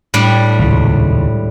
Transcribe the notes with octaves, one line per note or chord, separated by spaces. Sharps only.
A2 G3 D4
D#1 C#2